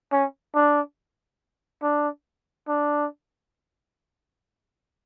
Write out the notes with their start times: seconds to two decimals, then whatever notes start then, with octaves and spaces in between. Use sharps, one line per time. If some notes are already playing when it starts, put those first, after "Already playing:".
0.12 C#4
0.55 D4
1.83 D4
2.68 D4